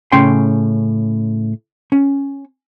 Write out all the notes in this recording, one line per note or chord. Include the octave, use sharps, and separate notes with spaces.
A2 C#3 C#4 G5 C6
C#4